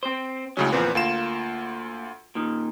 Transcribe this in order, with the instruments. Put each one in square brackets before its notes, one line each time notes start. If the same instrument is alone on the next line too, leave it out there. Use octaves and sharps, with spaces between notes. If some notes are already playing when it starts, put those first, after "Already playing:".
[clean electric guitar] C4 C5
[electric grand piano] C#2 C#3 C#4 [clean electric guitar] A2 F#3
[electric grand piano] E2 A#2 B4 [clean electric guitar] F3 C4
[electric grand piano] D2 F4 E7 [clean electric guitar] A#3
[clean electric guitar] A#2 D#3